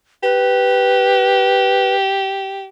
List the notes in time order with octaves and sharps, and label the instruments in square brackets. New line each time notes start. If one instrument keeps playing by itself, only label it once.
[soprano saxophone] G4 [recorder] B4